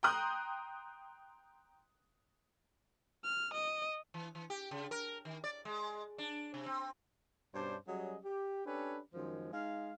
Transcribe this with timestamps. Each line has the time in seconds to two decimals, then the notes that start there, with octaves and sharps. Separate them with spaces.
0.03 G5 A#5 C6 D#6 F#6 G6
3.24 F6
3.53 D#5
4.14 E3
4.35 E3
4.50 G4
4.71 C#3
4.91 A#4
5.25 D#3
5.44 D5
5.65 G#3
6.18 D4
6.54 C3
6.66 C4
7.54 G2 B2 C#4 D4 C5
7.87 F#3 G3 C#4 G#4 D#5
8.24 G4
8.65 C#4 D4 G4 A4 B4
9.14 F#2 D#3 F3 G#3
9.52 G#3 D#4 F5